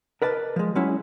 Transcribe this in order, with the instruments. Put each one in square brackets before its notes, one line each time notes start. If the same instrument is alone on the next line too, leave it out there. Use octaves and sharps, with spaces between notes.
[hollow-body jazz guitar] A#4 B4 D5 D#5 A5
F3 G#3
F#3 G#3 C#4 E4